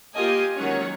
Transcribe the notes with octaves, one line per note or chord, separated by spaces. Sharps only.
A#3 F4 G4 D#5 G#5
D#3 F#3 G#3 C#4 C#5 F#5